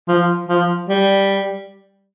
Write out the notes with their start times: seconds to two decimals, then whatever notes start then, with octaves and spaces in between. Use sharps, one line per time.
0.08 F3
0.48 F3
0.89 G3